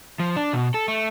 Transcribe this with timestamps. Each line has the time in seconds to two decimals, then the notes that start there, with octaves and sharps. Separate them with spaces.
0.20 F3
0.36 D4
0.53 B2
0.74 A4
0.88 A3